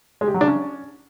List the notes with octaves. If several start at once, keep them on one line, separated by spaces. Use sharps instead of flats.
G#3
G4
F#3
D4
C#4